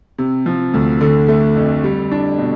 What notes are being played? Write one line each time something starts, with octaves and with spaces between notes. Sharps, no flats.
C3
F3
D2
D3
A3
F2
G3
D4
B2